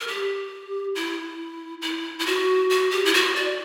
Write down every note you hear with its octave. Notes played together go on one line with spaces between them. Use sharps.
A#4
G4
E4
E4
E4
F#4
F#4
G4
E4
F#4
D5